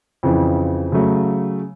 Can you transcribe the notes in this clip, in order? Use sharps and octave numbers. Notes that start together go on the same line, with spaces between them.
F2 C#3 E3
C#3 F#3 A3